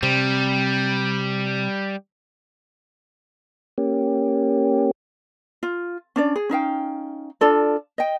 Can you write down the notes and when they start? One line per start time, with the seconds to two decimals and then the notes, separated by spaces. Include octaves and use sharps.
0.03 C3 G3 C4
3.78 A#3 C#4 G4
5.63 F4
6.16 C#4 D4 D5
6.36 G#4
6.49 C#4 D#4 F5 G5
7.41 D4 F4 A4 D5
7.98 D#5 G5